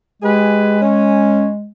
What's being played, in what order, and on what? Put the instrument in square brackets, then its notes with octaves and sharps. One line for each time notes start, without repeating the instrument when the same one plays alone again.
[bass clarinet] G#3 [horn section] G4 G#4 B4
[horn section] C#4